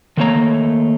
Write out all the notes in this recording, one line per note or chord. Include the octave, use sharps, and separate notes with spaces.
D#3 F#3 A3 A#3 C#5 A#5